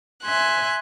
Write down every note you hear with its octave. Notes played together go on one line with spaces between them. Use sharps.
E5 G#5 C6 F#6